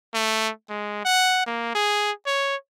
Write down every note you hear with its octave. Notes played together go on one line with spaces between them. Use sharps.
A3
G#3
F#5
A#3
G#4
C#5